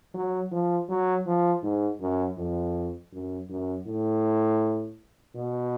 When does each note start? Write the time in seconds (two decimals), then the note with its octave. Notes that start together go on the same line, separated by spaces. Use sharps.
0.14 F#3
0.52 F3
0.89 F#3
1.26 F3
1.63 G#2
2.00 F#2
2.38 F2
3.12 F#2
3.50 F#2
3.86 A2
5.35 B2